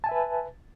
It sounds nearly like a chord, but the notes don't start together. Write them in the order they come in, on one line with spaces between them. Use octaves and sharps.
A5 G#5 E5 B4